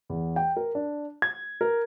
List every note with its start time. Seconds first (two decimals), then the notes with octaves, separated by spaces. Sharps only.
0.10 E2
0.36 G5
0.56 A#4
0.75 D4
1.22 G#6
1.61 A#4